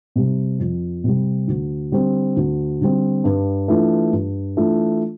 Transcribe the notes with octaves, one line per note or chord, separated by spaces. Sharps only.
C3 G3
F2
C3 G3
D2
D3 G3 C4
D2
D3 G3 C4
G2
E3 A3 D4 F4
G2
E3 A3 D4 F4